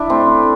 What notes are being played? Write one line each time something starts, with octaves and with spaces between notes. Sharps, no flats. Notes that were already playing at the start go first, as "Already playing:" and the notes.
Already playing: D4 E4
A3 C4